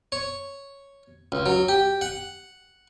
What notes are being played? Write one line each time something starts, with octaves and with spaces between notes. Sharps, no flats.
C#5
C#2
F#3
G4
F#5